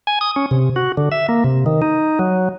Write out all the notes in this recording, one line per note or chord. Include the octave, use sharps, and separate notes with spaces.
G#5
D#6
C#4
C3
F#4
D3
E5
A#3
C3
D#3
D#4
F#3